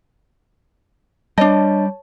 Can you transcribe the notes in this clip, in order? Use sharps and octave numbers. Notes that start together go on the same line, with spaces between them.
G3 D4 C#5 D#5 A5